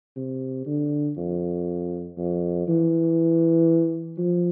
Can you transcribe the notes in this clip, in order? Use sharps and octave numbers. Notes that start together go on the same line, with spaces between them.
C3
D3
F2
F2
E3
F3